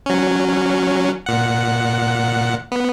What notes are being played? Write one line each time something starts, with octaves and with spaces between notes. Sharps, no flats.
F#3 C#4
A#2 F#5
B3